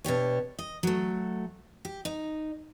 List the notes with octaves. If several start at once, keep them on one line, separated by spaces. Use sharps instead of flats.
B2 D4 G4 C#5
D#5
F#3 A3
G4
D#4